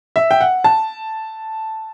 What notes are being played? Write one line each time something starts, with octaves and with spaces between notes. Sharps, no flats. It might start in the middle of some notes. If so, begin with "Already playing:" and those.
E5
G5
F#5
A5